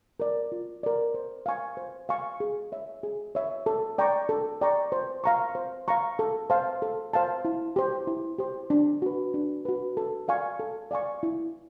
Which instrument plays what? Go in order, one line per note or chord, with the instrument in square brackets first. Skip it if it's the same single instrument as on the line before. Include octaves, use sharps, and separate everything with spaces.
[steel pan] A#4 D5
F4
A#4 D5
C5
F5 G#5 C#6
C5
F5 G#5 C#6
G#4
C#5 E5
G#4
C#5 E5
A4
D5 G5 A#5 C#6
A4
D5 G5 A#5 C#6
C5
F5 A#5 C#6
C5
F5 A#5 C#6
A4
C5 F5 A5
A4
C5 F5 A5
E4
G4 C5
E4
G4 C5
D4
F#4 B4
D4
F#4 B4
A4
D5 F5 G#5 C#6
A4
D5 F5 G#5 C#6
E4